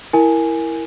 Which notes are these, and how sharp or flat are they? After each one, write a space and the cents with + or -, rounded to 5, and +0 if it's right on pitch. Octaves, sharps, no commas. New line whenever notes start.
E4 +0 A#4 +0 G#5 +0